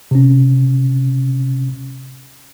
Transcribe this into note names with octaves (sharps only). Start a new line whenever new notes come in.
C3 C#4